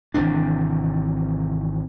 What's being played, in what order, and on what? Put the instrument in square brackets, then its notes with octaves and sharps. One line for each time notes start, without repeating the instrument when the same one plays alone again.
[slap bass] G#1 C3 E3 D4